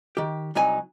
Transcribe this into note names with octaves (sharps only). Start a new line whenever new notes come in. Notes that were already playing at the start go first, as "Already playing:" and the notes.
D#3 G4
C2 F#3 D#4 G#5